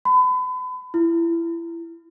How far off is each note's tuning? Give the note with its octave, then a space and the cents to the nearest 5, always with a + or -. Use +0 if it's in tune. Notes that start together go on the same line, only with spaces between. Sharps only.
B5 +35
E4 +25